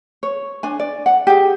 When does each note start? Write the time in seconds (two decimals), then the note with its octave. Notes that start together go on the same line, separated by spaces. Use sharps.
0.23 C#5
0.63 D4 G#5
0.80 D5
1.06 F#5
1.27 G4 G#4